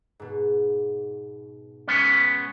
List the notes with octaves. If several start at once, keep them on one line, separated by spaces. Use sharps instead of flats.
G#2 B2
G#3 B3 C#4